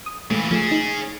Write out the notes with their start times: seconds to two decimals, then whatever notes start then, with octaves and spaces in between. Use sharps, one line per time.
0.06 D#6
0.31 A#2 E3 G#3 A3
0.51 F3 A3 C#4 G#4 E7
0.71 D#4